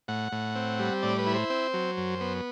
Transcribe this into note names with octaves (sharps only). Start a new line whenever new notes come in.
A2 F#5
A2
C4
G3
A2 D5
B4
E4
C5
C4
F#3
F#2
B3